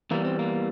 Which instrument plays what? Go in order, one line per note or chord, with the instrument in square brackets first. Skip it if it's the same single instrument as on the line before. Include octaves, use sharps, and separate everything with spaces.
[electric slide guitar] E2 E3 G3 A#3
C4
A#3